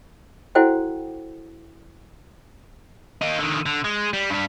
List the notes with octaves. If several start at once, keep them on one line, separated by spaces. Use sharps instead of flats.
E4 F#4 A4 C5 F#5 G5
A#3 D#4
D3 D#3
D3
G#3
G3
G2 G3